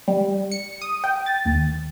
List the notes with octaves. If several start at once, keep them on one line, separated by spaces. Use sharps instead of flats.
G3
C#7
D#6
G5
A6
D#2